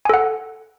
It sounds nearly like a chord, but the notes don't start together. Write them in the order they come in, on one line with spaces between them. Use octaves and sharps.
G#5 A4 F#5